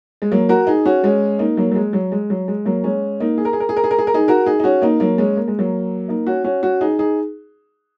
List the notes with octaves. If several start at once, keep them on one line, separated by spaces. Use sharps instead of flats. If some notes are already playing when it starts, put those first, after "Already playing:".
G#3
F#3 A#3
F#4 A#4
D#4 G#4
C#4 F#4
G#3 C#4
A#3 D#4
F#3 A#3
F#3
G#3
F#3
G#3
F#3
G#3
F#3 A#3
G#3 C#4
A#3 D#4
G#4
A#4
G#4
A#4
G#4
A#4
G#4
A#4
G#4
A#4
D#4 G#4
F#4 A#4
D#4 G#4
D#4
C#4 F#4
A#3 D#4
F#3 A#3
G#3 C#4
A#3
G#3
F#3 A#3
A#3 D#4
C#4 F#4
C#4 F#4
C#4 F#4
D#4 G#4
D#4 G#4